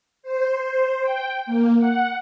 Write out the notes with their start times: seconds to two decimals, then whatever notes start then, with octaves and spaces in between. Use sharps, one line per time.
0.23 C5
1.02 G5
1.46 A#3
1.78 F#5